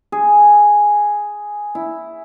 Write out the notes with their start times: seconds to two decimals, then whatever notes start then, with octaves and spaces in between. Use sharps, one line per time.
0.12 G#4
1.75 E4